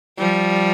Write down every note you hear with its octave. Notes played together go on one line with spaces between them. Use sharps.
F3 G3